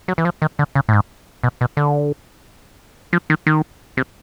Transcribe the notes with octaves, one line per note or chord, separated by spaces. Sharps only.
F#3
E3
F3
D#3
D3
C#3
A2
G#2
B2
B2
D3
F3
D#3
D#3
C3